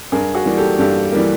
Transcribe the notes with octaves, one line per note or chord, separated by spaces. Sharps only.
G2 G#4 A#4
F#4 G#4
E3 G3 A#3
G4 A4
G2 G4 A4
E3 G3 A#3